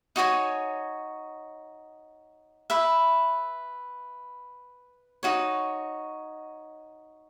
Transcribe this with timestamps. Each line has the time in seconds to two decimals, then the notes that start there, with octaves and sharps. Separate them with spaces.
0.16 D#4 F#4 C#5 G#5
2.70 B4 E5 B5
5.23 D#4 F#4 C#5